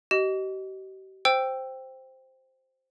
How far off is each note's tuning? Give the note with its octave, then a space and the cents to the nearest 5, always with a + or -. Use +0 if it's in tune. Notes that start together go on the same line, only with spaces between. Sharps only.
G4 -40 D#5 +0
C5 +0 G5 +5 E6 +10